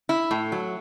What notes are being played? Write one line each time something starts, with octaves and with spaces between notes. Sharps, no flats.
E4
A2
F#3